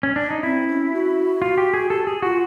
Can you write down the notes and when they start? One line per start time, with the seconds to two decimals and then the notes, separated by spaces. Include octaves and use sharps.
0.03 C#4
0.16 D4
0.30 D#4
0.43 C4 E4
0.68 C#4
0.93 F#4
1.42 F4
1.58 G4
1.74 G#4
1.90 G4 A4
2.07 G4 G#4
2.22 F4 F#4